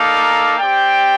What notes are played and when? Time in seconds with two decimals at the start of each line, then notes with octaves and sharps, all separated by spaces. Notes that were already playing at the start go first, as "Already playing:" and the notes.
Already playing: A#3 D#4 A4 D5 F5
0.58 C4 G4 D5 G5